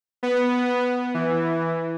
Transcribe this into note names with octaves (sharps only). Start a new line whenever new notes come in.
B3
E3